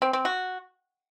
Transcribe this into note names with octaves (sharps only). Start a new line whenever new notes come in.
C4
C4
F#4